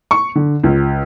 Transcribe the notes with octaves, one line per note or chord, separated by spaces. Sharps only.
C#6
D3
C#2